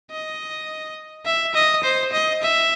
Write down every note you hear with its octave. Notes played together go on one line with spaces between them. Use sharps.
D#5
E5
D#5
C5
D#5
E5